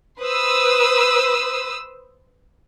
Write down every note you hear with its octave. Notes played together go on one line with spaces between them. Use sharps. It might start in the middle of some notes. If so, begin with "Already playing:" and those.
B4 C5 D#6 E6